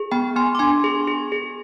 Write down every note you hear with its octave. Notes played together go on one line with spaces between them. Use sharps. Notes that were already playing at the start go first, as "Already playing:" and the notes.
Already playing: G#4
B3 G5 B5
B3 G#5 C6
D6
D4 G#5 C6
G#4
G#4
G#4